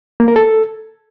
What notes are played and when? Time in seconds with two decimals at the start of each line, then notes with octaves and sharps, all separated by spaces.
0.20 A#3
0.28 A#4
0.36 A4